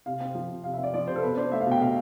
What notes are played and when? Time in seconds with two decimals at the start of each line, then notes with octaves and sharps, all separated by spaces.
0.06 C3 F5
0.20 C4
0.35 F3
0.50 C3
0.64 C3 F5
0.74 E5
0.78 C4 D5
0.94 F3 D5
1.07 C3 C5
1.16 A4
1.22 B2 B4
1.37 D4 C5
1.52 A3 E5
1.61 F5
1.66 B2
1.72 G5
1.81 B2 F5